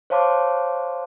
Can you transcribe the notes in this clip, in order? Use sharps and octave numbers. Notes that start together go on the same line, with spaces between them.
C5 C#5 F5 A5 C6 D6